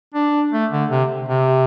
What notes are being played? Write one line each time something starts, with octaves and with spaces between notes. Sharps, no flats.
D4
A3
D3
C3
C3